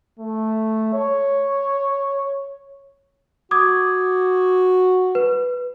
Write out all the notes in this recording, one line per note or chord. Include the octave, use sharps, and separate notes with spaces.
A3
C#5
F#4 D6 D#6 G#6
B4